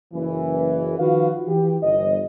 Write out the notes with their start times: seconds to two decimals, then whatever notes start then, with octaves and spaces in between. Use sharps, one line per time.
0.13 F#1 E3
0.99 D#3 F3 F4 F#4 B4 F5
1.48 E3 G4
1.82 G1 D#5